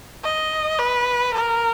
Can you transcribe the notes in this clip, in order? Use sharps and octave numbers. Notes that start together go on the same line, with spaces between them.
D#5
B4
A#4